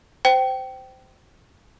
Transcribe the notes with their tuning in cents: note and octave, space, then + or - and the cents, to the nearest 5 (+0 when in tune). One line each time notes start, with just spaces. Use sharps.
C5 -15 G5 -20